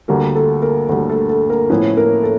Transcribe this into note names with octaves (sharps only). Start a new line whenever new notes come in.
D2 D3 G3 A#3 A#4
A3 A4
A#3 A#4
D2 D3 G3 A#3 A#4
A3 A4
A3 A4
A#3 A#4
A2 F3 A3 B3 C#4 E4 B4
A#3 A#4
A4